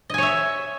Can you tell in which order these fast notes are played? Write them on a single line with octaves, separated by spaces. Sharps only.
D#5 G#5 C#5 E5